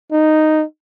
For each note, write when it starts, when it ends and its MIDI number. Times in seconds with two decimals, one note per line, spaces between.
0.12 0.64 63